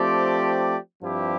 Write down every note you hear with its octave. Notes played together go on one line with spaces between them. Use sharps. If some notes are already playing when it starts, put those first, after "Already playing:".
Already playing: F3 A3 C4 G4 D5
G2 F3 C4 E4 G4